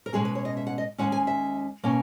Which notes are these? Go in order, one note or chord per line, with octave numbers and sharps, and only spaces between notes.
A#4
B2 G#3 C#4 G#4
B4
C#5
D#5
E5
F#5
D#5
D#2 D#3 G#3 C#4 F#5
G#5
E5
B2 A#3 C#4